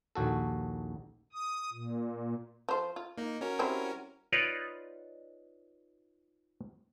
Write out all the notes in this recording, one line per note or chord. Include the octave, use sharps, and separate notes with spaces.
A#1 D#2 F#4 A4
D#6
A#2
F3 C5
F4
A#3 D#4
C#4 F#4 A#4
G3 C4 E4
D#4 F4 B4 C#5 D5